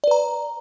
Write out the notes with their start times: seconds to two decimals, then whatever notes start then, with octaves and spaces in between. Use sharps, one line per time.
0.04 D5
0.07 B4
0.11 A#5